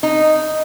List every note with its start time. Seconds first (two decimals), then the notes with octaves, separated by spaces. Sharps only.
0.03 D#4